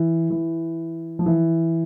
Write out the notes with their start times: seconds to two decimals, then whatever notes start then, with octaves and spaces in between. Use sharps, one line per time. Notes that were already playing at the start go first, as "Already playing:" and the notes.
Already playing: E3
0.30 E3
1.19 F3
1.26 E3